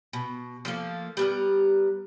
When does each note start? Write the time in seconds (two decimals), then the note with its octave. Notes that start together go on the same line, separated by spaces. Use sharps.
0.13 B2
0.65 F3 A3 A#3
1.17 G3 B3 A#4